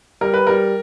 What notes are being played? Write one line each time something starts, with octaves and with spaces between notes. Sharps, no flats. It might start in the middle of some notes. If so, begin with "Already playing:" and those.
G3 A#4
B4
G3 A#4